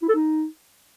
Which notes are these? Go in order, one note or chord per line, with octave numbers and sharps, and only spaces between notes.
E4
A4
D#4